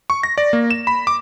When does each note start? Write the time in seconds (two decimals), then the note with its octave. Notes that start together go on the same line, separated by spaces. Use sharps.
0.10 C#6
0.23 A#6
0.38 D5
0.53 A#3
0.71 E7
0.87 B5
1.07 D6